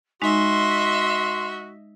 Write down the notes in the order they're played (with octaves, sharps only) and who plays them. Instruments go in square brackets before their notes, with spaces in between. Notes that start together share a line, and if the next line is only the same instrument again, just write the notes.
[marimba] G#3 D#4 [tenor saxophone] F#4 [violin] D#5 E5 [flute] C6